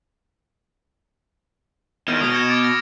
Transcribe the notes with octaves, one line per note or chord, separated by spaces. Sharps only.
E2 D#3 F6 G#6
B2 D#6 F6
G#6 C#7 E7
D6 A6 D7
A#6